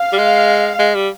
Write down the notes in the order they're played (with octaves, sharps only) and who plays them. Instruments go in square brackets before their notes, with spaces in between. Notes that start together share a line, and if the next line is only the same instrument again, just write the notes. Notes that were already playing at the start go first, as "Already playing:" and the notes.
Already playing: [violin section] F5
[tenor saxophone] G3
G#3
G#3
G3